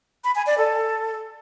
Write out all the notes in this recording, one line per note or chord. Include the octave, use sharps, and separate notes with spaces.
B5
G#5
D5
A4